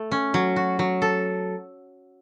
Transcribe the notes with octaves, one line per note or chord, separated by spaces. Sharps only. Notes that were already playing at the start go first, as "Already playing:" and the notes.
Already playing: A3
C#4
F#3
F#4
F#3
A4